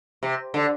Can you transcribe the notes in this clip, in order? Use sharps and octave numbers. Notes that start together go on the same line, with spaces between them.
C3
D3